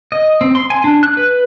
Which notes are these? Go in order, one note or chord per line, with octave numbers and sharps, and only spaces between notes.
D#5
C4
C6
G#5
D4
F#6
B4